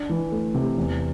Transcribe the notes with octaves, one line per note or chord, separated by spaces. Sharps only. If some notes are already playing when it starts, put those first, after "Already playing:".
Already playing: D4
E3
A3
C3
E2